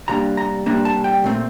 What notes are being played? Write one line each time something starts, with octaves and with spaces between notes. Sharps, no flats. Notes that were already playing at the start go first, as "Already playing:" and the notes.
C3 G3 A#3 D4 A#5
A#5
C3 G3 A#3 D4 A#5
A5
G5
A#2 A3 C4